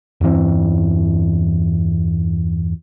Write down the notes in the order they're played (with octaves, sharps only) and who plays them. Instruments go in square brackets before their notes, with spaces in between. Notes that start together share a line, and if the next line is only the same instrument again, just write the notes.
[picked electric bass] E2 G2 E3 C4